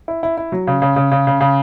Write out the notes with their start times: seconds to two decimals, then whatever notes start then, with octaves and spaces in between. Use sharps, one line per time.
0.08 E4
0.23 E4
0.38 E4
0.52 F#3
0.67 C#3
0.82 C#3
0.96 C#3
1.12 C#3
1.27 C#3
1.41 C#3